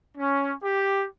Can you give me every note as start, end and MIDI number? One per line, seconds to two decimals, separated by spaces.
0.17 0.54 61
0.63 1.06 67